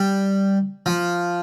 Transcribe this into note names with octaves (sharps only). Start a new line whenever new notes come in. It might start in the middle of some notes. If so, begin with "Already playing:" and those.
Already playing: G3
F3